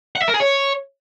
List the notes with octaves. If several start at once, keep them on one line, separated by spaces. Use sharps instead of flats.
F#5
E5
A#4
G#4
C#5